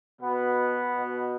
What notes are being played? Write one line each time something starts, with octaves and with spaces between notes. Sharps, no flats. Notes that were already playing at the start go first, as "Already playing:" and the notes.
B2 B3
B2